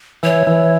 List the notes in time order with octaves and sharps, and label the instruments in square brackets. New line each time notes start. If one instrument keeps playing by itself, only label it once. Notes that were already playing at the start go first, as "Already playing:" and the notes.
[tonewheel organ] E3 [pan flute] C#5
[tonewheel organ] E3